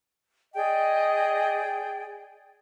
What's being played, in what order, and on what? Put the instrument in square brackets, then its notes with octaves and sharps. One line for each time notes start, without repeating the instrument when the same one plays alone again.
[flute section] G#4 D5 G5 [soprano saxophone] D#5